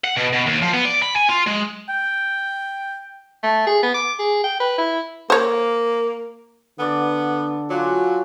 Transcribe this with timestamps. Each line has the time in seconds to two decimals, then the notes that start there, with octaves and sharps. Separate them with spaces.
0.04 F#5
0.17 B2
0.33 B2
0.46 D#2
0.62 F3
0.74 B3
0.85 D5
1.02 B5
1.16 G#5
1.29 F4
1.47 G#3
1.89 G5
3.43 A3
3.67 G#4
3.83 B3
3.94 D6
4.19 G#4
4.44 G5
4.60 B4
4.78 E4
5.30 A#3 C5 C#5
6.79 D3 B3 A4 D5
7.70 F#3 F4 F#4 D5 G#5